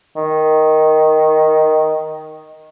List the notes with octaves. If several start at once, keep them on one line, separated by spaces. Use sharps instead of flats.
D#3